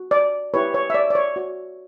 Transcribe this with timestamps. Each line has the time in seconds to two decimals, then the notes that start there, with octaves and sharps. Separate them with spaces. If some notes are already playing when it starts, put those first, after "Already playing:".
Already playing: F#4
0.11 D5
0.54 E4 G4 B4 C#5
0.74 C#5
0.90 E5
0.94 D5
1.10 D5
1.15 C#5
1.36 F#4 C#5